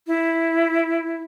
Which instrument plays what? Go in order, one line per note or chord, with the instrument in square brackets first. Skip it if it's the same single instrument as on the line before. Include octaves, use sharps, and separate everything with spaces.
[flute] E4